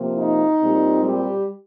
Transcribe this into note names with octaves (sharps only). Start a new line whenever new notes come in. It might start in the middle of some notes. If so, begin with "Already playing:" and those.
Already playing: C3 F3 A#3
D#4
A#2 G3 C4
G3 G4